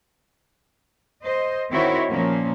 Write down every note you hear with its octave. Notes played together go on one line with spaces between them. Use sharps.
C5 D#5
D#3 C4 E4 F#4 C5 C#5
A#2 F3 A#3 C#4